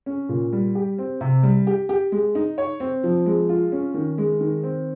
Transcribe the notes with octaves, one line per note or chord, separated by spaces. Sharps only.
C#4
A#2
G3
G4
C4
C3
G3
G4
G4
G#3
D#4
C#5
C4
F3
G#3
F4
C#4
D#3
G#3
D#3
C4